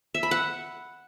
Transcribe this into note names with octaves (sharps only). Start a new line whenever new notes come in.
E5
B5
F#5